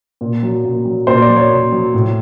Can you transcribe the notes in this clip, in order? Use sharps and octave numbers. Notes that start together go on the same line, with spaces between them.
A#2
F#3
A#2
F#3
A#2 C5
D5
F#3
C#5
A#2
F#3
A2